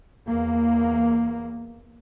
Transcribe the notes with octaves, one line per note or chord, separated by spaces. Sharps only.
E2 A#3